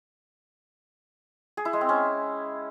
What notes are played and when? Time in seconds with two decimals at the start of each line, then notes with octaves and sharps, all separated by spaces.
1.57 G#4
1.65 E4
1.73 G#3
1.81 C4
1.89 C#4